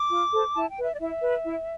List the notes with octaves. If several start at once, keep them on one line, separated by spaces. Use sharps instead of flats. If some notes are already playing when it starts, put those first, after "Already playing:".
Already playing: D6
F4
A4 C5
E4 A5
G5
B4
E5
D5
E4 E5
B4
E4